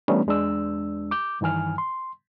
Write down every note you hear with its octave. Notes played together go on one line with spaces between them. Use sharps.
E3 G3 A3 B3 C#4 D4
E2 G#3 D4 E6
D6 G6
G2 D#3 E3 G#5 F6
C6